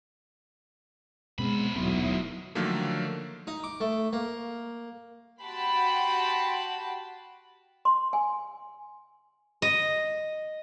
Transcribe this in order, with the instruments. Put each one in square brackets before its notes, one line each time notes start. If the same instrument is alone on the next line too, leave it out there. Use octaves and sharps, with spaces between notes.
[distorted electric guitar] F#2 B5 [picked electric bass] B2 B3 C4 [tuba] G#3
[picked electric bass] D#1 B3 [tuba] B1 [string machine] F#3 E4 D#6 [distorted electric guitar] A3 F4
[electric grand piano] D3 D#3 F3 F#3 A3 A#3
[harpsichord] D#4
D6
A3
A#3
[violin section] F#4 G4 G5 A5 B5 C6
[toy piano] C6
G#5
[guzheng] D#5